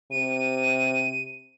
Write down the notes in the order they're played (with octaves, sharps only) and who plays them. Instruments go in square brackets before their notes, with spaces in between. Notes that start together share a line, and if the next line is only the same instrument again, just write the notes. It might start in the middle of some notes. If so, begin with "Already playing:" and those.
[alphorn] C3 [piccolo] D#7